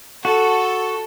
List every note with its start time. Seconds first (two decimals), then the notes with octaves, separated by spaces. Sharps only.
0.25 F#4 A4